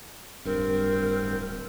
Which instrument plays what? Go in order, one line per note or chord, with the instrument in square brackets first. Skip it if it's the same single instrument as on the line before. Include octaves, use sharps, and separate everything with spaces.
[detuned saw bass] D1 [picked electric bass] G2 [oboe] C4 [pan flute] A#4